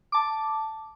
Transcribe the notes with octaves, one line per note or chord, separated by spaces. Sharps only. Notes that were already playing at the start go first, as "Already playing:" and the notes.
A5 D6